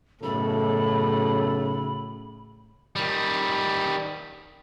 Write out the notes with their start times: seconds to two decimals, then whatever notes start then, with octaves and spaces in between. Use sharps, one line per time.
0.23 B1 F#2 A2 C#3 A4 B5
2.96 D#3 G3